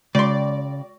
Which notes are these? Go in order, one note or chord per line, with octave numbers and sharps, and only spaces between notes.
C#3 G#3 D5 C6